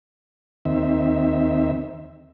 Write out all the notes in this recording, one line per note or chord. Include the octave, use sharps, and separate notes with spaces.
D#2 D#3 C4 E5